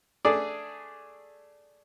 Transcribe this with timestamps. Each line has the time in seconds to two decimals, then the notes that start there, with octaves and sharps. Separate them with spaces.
0.25 A3 D4 G#4 D5